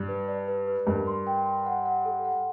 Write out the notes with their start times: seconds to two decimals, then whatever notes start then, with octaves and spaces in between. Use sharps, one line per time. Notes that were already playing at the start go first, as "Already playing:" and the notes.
Already playing: G2
0.08 B4
0.28 D5
0.48 B4
0.68 B4
0.87 G2 A#4
1.07 C6
1.27 G5
1.46 C6
1.66 F#5
1.86 F#5
2.05 A4
2.25 F#5